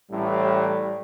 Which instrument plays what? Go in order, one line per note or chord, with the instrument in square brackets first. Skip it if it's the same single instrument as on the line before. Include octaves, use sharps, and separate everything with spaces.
[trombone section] A1 A2 [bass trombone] G3